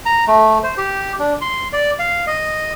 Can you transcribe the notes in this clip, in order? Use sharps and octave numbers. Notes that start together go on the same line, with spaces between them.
A#5
A3
C5
G4
D4
C6
D5
F5
D#5